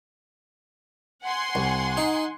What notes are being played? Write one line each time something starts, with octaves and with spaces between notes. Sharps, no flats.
F#5 G#5 C6
C2
D#4